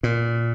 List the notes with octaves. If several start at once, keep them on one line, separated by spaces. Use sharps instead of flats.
A#2